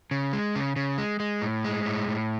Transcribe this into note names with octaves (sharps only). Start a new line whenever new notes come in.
C#3
G#3
C#3
C#3
G#3
G#3
A2
G#3
A2
A2